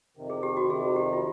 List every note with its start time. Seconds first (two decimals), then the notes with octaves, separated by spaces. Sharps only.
0.17 F2 C3 D#3
0.30 G#4
0.43 G4
0.57 F#4
0.69 F2 C3 D#3 G#4
0.96 G4
1.13 F4